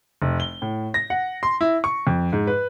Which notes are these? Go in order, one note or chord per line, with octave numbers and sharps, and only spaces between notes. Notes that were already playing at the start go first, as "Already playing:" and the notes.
F1
G7
A2
A#6
F#5
C6
E4
C#6
F2
G#2
B4